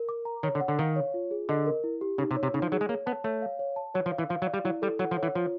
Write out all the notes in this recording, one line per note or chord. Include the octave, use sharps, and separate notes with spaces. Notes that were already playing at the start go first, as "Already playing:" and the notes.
Already playing: A#4
D6
A#5
D#3 C#5
D3
F#5
D3
D#3 F5
C#5
F4
G#4
D3 D#5
A#4
E4
G4
C#3 D#4
C3
C#5
C3
C#3 D#4
F3
F#3 G#4
G#3
A#3 C#5
B3 A5
A3 C#5
F5
C#5
A5
F#3 C#5
F3
F5
E3
F3 F5
F#3
D5
G3
F#3 E4
G3 A4
F#3 F#5
F3
C#5
E3
F3 F4